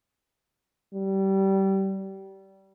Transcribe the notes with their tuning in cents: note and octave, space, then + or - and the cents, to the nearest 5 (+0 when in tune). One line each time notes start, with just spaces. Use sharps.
G3 -20